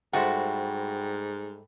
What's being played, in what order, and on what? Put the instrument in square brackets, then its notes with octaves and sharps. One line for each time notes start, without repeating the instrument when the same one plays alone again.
[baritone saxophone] G#2 [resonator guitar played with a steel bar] G3 A3 C5 [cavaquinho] E4 F#4 [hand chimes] G5